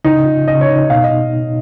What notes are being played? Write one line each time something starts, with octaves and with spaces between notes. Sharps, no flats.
C#3 D#4
F4
C#3 D#5
C#5
D#4
D#5
B2 F5
D#5